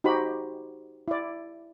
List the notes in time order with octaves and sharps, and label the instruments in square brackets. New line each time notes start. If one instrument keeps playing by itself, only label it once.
[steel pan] D#4 F#4 G4 C5 B5
E4 D5